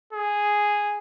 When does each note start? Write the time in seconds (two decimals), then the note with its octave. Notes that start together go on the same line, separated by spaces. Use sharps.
0.13 G#4